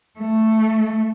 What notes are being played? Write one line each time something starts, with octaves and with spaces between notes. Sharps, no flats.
A3